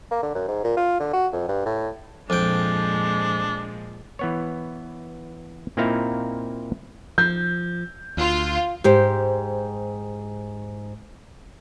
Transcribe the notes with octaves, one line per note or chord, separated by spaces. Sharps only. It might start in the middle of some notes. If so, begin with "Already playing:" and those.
A#3
D3
F#2
G#2
A#2
F4
D3
F#4
F2
G2
A2
F2 A#2 F3 G#3 D4 G5
E3 B3 C#5
A#2 A#3 C4 D#4 E4 F5
F3 G6
D2 F4
G#2 G4 C5